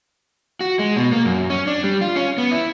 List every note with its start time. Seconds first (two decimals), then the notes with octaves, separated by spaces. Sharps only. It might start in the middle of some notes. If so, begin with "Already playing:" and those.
0.61 F#4
0.79 G#3
0.97 B2
1.13 A#3
1.25 F#2
1.50 C#4
1.67 D4
1.84 G3
2.01 F4
2.16 C#4
2.38 B3
2.51 E4